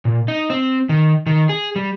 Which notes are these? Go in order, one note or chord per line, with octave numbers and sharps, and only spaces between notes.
A#2
D#4
C4
D#3
D#3
G#4
G3